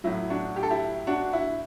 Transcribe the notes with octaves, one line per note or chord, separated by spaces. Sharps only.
A2 F#3 E4
D4 F#4
G4
A4
E4 G4
D4 F#4
E4